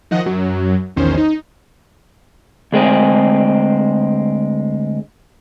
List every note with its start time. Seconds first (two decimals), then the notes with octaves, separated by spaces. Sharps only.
0.11 D#3 F3 D#5 F#5
0.26 F#2 F#3
0.96 A#1 E2 D#3 C#4 C5
1.17 D#4
2.72 D2 G#3 C4 G#4